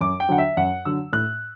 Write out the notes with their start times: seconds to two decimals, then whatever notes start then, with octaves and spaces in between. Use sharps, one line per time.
0.01 F#2 D6
0.20 G5
0.29 D3 F#3 F#5
0.38 E5
0.57 F#2 F#5
0.85 D3 F#3 E6
1.13 A2 F#6